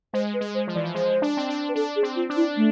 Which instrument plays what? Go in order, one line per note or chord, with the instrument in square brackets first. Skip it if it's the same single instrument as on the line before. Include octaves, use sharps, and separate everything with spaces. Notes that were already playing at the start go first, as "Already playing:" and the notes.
[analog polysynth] G#3 [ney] C5
[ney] B4
[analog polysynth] G#3
[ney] C5
[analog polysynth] F3
[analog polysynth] E3 [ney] D5
[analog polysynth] F3
[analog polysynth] G#3 [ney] C5
[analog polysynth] D4
C4
D4
[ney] B4
[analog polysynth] D4 [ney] A4
[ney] G#4
[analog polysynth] C4
[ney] F4
[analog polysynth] D4
[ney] E4
A3